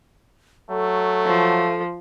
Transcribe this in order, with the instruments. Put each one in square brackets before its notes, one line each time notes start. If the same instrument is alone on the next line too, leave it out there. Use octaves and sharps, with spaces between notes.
[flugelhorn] F#3 [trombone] A3 [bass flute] A4
[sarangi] F3